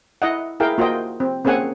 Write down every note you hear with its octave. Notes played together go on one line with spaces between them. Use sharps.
E4 D#5 F#5
E4 G#4 A#4 F5 G5
A#3 F4 F#4 C5 D#5 G5
C4
A#3 C4 C#4 G#4 F#5 G#5